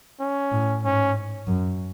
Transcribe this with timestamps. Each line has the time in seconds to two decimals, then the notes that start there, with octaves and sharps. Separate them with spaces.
0.20 C#4
0.52 A2
0.83 G#2 C#4
1.47 F#2